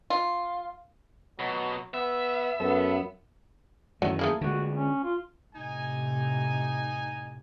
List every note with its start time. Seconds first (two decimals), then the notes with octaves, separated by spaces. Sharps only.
0.10 F4
1.39 B2 F#3
1.94 B3 E5
2.60 F#2 B3 A4
4.02 F#2 D#3 E3 F#3 A3
4.19 A3 A#3 E4 G#4
4.41 D3 G#3 F#4
4.74 C#4
5.04 F4
5.55 A2 C3 D#4 G#5